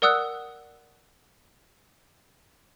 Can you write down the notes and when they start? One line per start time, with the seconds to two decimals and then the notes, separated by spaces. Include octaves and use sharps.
0.02 A#4 D5 F#5 D#6 E6 F#6